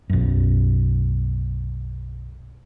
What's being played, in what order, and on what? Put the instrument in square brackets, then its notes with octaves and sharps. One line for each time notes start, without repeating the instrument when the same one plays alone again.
[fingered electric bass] B1 F#2